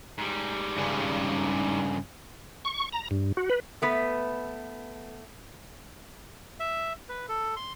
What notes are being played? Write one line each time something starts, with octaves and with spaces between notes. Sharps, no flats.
G#2 G3
G2 C#3
C#6
A#5
G2
F#4
B4
A3 B3 B4
E5
B4
A4
C6